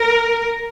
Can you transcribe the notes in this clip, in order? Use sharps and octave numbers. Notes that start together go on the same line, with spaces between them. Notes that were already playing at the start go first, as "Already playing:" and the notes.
Already playing: A#4